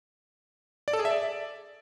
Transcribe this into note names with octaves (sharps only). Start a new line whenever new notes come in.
D5
A4
G#4
E5
D5